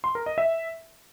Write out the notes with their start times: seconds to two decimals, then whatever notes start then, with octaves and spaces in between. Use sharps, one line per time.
0.04 C6
0.15 A#4
0.26 D#5
0.38 E5